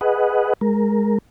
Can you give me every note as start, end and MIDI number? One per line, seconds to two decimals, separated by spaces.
0.01 0.53 68
0.01 0.53 71
0.01 0.53 75
0.01 0.53 78
0.61 1.18 56
0.61 1.18 70